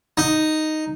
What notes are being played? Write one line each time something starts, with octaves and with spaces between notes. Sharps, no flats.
D#4